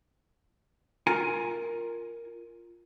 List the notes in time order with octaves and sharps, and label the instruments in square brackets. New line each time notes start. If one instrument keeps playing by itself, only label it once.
[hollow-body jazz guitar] F4 A#4 G#5 A#5